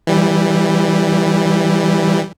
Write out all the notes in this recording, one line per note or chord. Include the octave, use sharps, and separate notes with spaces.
E3 G3